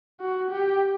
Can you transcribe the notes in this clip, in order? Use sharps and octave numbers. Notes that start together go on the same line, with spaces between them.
F#4
G4